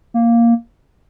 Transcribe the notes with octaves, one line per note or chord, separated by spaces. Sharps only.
A#3